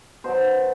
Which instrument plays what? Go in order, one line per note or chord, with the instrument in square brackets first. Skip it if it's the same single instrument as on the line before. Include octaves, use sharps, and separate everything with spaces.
[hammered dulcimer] B2 F#3 C5